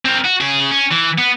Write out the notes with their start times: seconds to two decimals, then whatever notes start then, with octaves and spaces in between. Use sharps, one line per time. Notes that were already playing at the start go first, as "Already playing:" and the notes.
0.05 C4 A#4
0.25 F#4
0.41 C#3 G#4
0.72 C#4
0.91 E3
1.18 B3